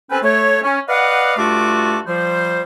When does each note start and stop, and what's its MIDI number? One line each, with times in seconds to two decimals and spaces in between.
0.10 0.18 60
0.10 0.18 61
0.10 0.18 69
0.10 0.18 71
0.10 0.18 79
0.10 0.18 80
0.23 0.60 57
0.23 0.60 73
0.63 0.79 61
0.88 1.36 71
0.88 1.36 74
0.88 1.36 75
0.88 1.36 77
0.88 1.36 78
1.37 2.00 43
1.37 2.00 57
1.37 2.00 65
1.37 2.00 66
1.37 2.00 69
1.37 2.00 86
2.07 2.62 53
2.07 2.62 55
2.07 2.62 72